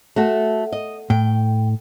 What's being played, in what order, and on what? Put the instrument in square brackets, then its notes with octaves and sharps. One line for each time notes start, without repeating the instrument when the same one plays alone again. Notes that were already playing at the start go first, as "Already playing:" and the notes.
[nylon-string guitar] A3 F#4 A4
D#5
[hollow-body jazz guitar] A2 [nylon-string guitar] G5